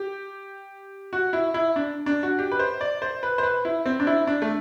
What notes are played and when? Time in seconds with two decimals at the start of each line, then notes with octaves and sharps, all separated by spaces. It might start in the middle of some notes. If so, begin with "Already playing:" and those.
Already playing: G4
1.13 F#4
1.33 E4
1.54 E4
1.76 D4
2.06 D4
2.23 F#4
2.39 G4
2.52 B4
2.59 C5
2.81 D5
3.02 C5
3.23 B4
3.38 C5
3.43 B4
3.65 E4
3.86 C4
4.00 D4
4.07 E4
4.27 D4
4.42 A3